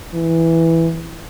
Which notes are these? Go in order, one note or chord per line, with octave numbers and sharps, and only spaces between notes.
E3